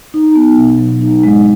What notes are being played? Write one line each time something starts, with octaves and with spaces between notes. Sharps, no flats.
D#4
B3
B2
F#3
D#4
G#3